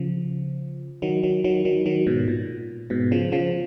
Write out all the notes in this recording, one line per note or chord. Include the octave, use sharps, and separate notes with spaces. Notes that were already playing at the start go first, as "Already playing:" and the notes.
Already playing: C#3 F3
D#3 F#3
D#3 F#3
D#3 F#3
D#3 F#3
D#3 F#3
G#2 B2
A#2
G#2 B2
C#3 F3
C#3 F3